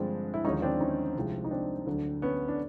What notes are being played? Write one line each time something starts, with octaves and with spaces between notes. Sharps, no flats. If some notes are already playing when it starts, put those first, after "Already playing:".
Already playing: G2 D3 F3 G#3 C4 D4
E4
D#2 D3 F3 G#3 C#4 D#4
C4 D4
C#4 D#4
C2 C3 F3 G#3
D#4
C4 D4
D2 D3 F#3
B3 C#4
D4